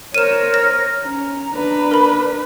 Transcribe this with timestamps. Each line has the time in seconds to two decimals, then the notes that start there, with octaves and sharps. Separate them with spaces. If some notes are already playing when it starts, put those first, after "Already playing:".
0.14 A#4 C5 C#5 F6 D#7 E7
0.54 A#6
1.04 C#4 A#5
1.54 D4 B4
1.91 A#4 B5